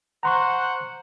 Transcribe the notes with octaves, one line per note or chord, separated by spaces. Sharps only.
C5 F#5 A#5 C6 C#6